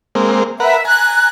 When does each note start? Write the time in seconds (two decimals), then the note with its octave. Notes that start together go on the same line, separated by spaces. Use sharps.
0.15 G#3 A#3 C4
0.60 A#4 B4 E5 F#5
0.85 G#5 A#5 F#6